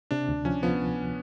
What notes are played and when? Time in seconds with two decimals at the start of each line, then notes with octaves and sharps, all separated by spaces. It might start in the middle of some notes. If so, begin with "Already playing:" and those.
0.11 C3 D4
0.29 D2
0.45 F3 C#4
0.63 F3 B3